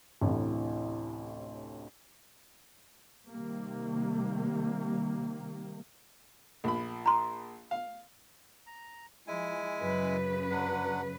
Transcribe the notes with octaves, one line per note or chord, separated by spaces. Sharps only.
A1 D2 A2 C3
C3 D#3 G3 A#3
A#1 B5
A#5 C6
F5
A#5
F3 G#3 E4 G#5
F#2 C#3 B4
F#3 D4 F#5